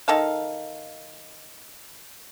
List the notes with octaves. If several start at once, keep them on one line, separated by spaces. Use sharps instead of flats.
D#3 A4 F5